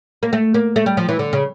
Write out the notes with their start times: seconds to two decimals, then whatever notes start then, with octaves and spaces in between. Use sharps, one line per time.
0.23 A#3
0.33 A3
0.54 A#3
0.76 A3
0.86 G3
0.97 F3
1.09 E3
1.19 D3
1.33 C#3